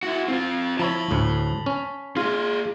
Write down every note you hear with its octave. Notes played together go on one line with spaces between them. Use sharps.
E4 F#4
C4 F4
F3 E4 C#5 A5 B5
D2 A2
C#4
A#3 F4 G#4